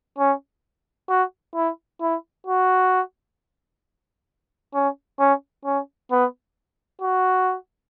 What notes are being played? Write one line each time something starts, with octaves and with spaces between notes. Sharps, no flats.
C#4
F#4
E4
E4
F#4
C#4
C#4
C#4
B3
F#4